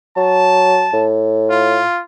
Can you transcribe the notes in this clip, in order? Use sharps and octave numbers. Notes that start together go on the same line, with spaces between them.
F#3 A5
A2
F4